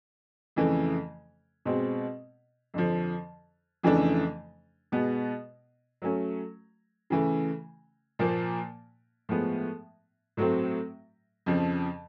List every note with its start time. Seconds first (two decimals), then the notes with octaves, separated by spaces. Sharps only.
0.56 F2 C#3 E3 A3
1.65 B2 G#3 C4
2.74 F2 D3 F3
3.83 F2 C#3 E3 A3 D4
4.92 B2 G#3 B3
6.02 F#3 A3 C#4
7.10 C#3 E3 A3
8.19 A#2 F3 A#3
9.29 A2 F3 G#3 B3
10.37 A2 F#3 A3 C4
11.46 F2 C#3 F3